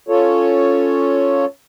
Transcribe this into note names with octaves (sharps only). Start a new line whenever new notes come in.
C#4 F4 A4 C#5